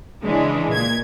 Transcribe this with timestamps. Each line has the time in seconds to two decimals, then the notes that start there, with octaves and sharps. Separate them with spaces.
0.24 C#3 E3 G#3 D4
0.71 A#2 G#6